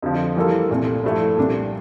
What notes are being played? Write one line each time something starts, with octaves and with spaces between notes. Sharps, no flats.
F2 D3 F3
E3 G3 A#3 F4 A4
C2 A#2 A3
G2 F3 A3 E4
C2 A#2 G3 D4